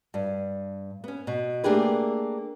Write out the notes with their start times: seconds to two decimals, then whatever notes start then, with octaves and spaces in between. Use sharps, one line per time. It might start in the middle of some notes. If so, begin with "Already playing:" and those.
0.14 G2
1.04 B3 C#4
1.27 B2
1.64 A3 A#3 D4 G4 G#4 B4